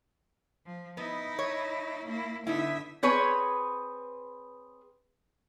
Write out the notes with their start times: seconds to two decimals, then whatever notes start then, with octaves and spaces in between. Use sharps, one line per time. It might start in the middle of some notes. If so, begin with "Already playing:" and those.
0.66 F3
0.97 B3 D#4 E4
1.39 C#5
2.05 A#3 E4
2.47 D3 B3 D#4 E4 E5
3.03 C4 G#4 B4 C#5